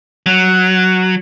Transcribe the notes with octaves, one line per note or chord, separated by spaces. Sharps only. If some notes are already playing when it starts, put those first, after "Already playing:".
F#3